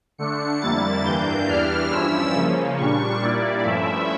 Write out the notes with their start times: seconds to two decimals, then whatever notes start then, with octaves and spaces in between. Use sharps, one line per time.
0.18 D3 A3 D4 C#7
0.61 F2 D3 G3 A#3 E4 A6
1.04 G2 E3 A#3 D4 G6
1.48 E2 E3 G3 D4 F6
1.91 G2 F3 C#4 E4 E6
2.34 C#3 F3 A#3 C#4
2.78 A#2 G3 D4 C#6
3.21 A#2 G3 A#3 E4 D5
3.64 G2 F3 A3 C#4 E4 E5